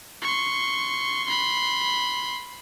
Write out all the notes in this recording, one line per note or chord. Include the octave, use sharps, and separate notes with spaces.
C6 C#6
B5 C6